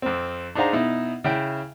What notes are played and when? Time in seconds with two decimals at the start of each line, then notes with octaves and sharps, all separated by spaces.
0.02 F2 C4
0.55 D4 D#4 G#4 C5 F5 A#5
0.73 B2 D#4 E4
1.24 C#3 E4 E5 G5